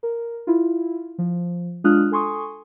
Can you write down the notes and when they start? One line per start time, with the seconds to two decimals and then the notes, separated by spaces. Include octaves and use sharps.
0.03 A#4
0.47 E4 F4
1.18 F3
1.84 G#3 D4 F4 D#6 F6 F#6
2.11 A4 G#5 C6 C#6 D#6